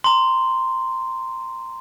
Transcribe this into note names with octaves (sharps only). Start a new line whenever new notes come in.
A#5 C6